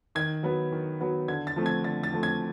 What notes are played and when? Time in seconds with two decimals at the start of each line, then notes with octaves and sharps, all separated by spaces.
0.15 D#3 G#6
0.43 F#3 B3
0.72 D#3
1.01 F#3 B3
1.28 D3 G#6
1.47 A6
1.56 F3 A3 C4
1.66 G#6
1.84 D3 A6
2.03 A6
2.12 F3 A3 C4
2.23 G#6